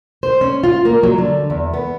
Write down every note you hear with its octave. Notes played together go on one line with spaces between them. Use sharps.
C5
C#4
F4
A#3
F#3
D3
E2
B3